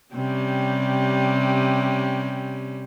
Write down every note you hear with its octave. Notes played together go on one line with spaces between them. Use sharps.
C3 G3 C#4